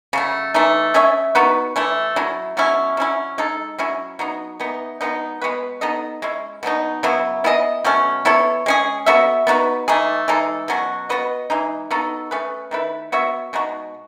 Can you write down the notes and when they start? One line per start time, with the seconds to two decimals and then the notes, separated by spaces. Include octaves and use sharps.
0.13 C#3 F#3 A3
0.54 E3 A3 D#4
0.94 C#4 G#4 C#5 E5
1.35 B3 D#4 F#4 B4
1.76 E3 A3 E4
2.16 F#3 C#4 E4
2.57 B2 F#3 C#4 E4
2.97 F#3 C#4 E4
3.38 G#3 D#4 A4
3.78 F#3 C#4 E4
4.19 F#3 B3 D#4
4.60 E3 B3 D#4
5.01 B2 G#3 B3 D#4
5.42 G#3 B3 F#4 B4
5.81 B3 D#4 A4 D#5
6.22 G#3 C#4 E4
6.63 B2 F#3 B3 D#4
7.03 C#3 F#3 B3 E4
7.44 B3 E4 G#4 D#5
7.84 B2 F#3 A3 C#4
8.25 B3 E4 A4 C#5
8.66 G#3 C#4 G#4
9.06 B3 F#4 A4 E5
9.47 B3 D#4 F#4 B4
9.88 E3 A3 D#4 G#4
10.28 E3 G#3 D#4 A4
10.68 B2 F#3 C#4 F#4
11.09 B3 F#4 B4 D#5
11.50 E3 G#3 D#4
11.91 B3 D#4 F#4 A4
12.31 A3 C#4 G#4 B4
12.71 D#3 A3 E4 B4
13.12 B3 F#4 C#5 E5
13.53 B2 G#3 D#4 F#4